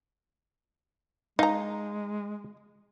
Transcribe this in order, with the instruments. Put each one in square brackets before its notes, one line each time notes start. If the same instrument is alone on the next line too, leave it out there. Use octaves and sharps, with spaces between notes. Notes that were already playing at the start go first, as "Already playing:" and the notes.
[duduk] G#3 [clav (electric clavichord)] D#4 [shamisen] F5 A#5